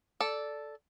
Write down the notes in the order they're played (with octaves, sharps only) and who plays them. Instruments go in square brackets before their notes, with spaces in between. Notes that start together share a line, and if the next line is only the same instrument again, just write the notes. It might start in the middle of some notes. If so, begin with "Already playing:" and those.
[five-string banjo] A4 D5